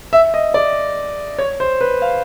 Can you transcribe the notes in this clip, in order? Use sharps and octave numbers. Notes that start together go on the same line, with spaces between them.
E5
D#5
D5
C#5
C5
B4
F5